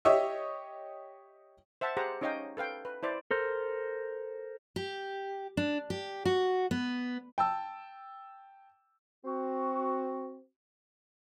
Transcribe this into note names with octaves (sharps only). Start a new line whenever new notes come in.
G4 C#5 D#5 E5
C5 E5 F#5 A5
G4 G#4 C5 F#5 A#5
C#4 D#4 C#5 D#5 F5 G5
A4 B4 F5 G5
B4
E4 C5 D5
A4 A#4 C5
G4
D4
G4
F#4
B3
G5 A5 E6
C4 F#4